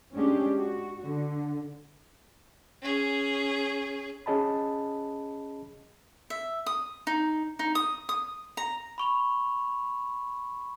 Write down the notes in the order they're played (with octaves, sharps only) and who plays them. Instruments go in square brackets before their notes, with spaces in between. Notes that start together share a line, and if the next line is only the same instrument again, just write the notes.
[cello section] G#3 C#4 D4 G4
F#4
D3
[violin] C#4 G#4
[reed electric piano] C#4 G#4 D#5 A5 B5
[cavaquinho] E5
D#6
D#4
D#4
D#6
D#6
A#5
[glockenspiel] B5 C#6 F7